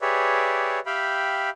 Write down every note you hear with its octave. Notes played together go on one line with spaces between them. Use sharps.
G4 G#4 B4 C#5 D5 E5
G4 E5 F5 G5 B5